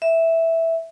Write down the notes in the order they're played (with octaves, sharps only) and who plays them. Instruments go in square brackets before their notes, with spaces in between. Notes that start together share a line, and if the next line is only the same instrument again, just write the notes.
[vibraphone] E5